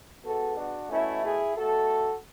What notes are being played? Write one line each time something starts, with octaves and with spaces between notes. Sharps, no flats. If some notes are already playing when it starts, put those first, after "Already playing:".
B2 G#3 B3 F#4 A4
D4 F#4
B2 A3 C#4 E4
E4 G#4
B2 A3 F#4 A4